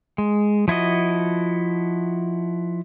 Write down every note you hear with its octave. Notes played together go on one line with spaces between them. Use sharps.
G#3
F3 E4 F#4 D#5